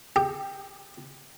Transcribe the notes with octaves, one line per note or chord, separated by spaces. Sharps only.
G4